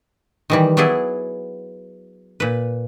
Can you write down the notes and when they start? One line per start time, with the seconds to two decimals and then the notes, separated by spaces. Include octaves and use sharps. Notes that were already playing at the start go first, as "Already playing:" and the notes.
0.50 D#3 E3 G3
0.77 F#3 B3 E4 G#4 D5
2.40 A#2 B4